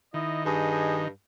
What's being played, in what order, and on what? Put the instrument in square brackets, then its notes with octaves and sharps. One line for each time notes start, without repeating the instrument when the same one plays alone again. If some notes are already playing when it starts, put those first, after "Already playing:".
[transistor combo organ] D#3 [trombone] E4 [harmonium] D#5
[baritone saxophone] G2 [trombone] G#4